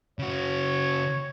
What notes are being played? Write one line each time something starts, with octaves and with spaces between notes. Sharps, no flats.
C#3 F#4 C#5